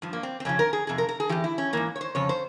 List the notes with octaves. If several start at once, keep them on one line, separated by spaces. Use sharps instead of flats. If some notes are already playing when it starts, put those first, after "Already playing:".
G2 F3
A#3
C4
C4
F2 C#3 F3 C#4
A#4
G#4
F2 C3 G#4
A#4
A#4
G#4
E2 E3 G4
E4
C#4
G#2 E3 A#3
C#5
C5
F2 C#3 C#5
C5